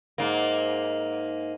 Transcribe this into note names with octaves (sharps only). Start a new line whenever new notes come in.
G#2 A#3